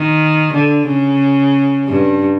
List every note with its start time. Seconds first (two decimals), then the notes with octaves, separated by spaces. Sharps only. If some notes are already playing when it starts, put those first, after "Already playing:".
Already playing: D#3
0.53 D3
0.87 C#3
1.89 G2